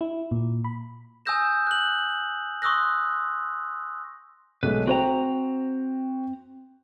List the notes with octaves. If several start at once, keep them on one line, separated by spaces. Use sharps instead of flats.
E4
A#2
B5
G#5 D#6 E6 G6 A#6 E7
F#6 F#7
C6 C#6 D#6 E6 F#6 A#6
B1 G#3 A3 B4
C4 F#4 C5 G5 A#5